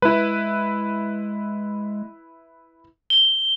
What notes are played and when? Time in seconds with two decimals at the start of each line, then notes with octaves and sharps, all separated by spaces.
0.02 G#3 E4 B4
3.10 G7